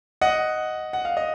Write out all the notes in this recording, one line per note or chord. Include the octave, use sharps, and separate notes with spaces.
D#5 F#5
F#5
F5
D#5